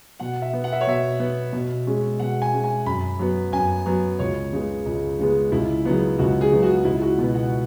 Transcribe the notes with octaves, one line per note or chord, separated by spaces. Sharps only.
B2 F#5
E5
B3
F#5
E5
C#5
B2 E5
B3
B2
G#3 C#4
B2 F#5
G#5
G#3 C#4
G#5
F#2 B5
F#3 B3
F#2 G#5
F#3 B3
C#2 C#5
C#3 G#3 B3
C#2
C#3 G#3 B3
C#2 E4
C#3 F#3 B3
C#2 F#4
G#4
C#3 F#3 B3
F#4
C#2 E4
F#4
B2 B3
F#5